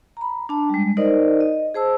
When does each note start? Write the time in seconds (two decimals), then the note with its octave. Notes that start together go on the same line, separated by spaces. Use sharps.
0.17 A#5 B5
0.49 D4 A5
0.69 G3 G#3
0.97 D#4 A#4 C5 D5 D#5
1.41 D#5
1.74 G#4 C5 A5 E6